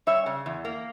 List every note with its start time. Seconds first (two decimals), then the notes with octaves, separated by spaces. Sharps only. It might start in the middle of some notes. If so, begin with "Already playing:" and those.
0.07 G3 C#5 E5
0.26 C#3
0.46 E2
0.65 A#3